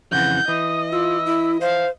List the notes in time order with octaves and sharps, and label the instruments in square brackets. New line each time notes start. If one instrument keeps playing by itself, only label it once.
[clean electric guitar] F2 C#3 E3 [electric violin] F#5 G6
[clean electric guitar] E3 [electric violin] D#5 [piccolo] D#6
[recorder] F4 [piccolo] E6
[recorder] E4
[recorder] C5 [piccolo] F5